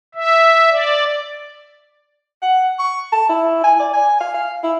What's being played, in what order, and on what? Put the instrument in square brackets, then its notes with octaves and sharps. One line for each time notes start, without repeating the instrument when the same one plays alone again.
[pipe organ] E5
D5
[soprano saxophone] F#5
C#6
A5
E4
G#5
D5
G#5
F5
F5
E4